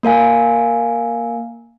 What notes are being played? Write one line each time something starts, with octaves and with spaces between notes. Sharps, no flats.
A#3 A#4 F5 G#5